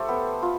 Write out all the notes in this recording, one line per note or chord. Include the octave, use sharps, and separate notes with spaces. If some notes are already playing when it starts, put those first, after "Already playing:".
Already playing: A3 G4 A4 C5
B3
F4